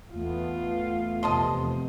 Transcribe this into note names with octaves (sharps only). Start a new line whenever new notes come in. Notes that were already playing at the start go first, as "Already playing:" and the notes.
E2 A3 B3 F4
F2 C3 D#5 A5 C6